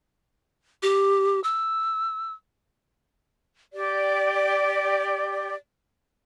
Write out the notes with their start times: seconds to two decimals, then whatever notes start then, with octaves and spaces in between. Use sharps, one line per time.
0.83 G4
1.44 E6
3.72 G4 D5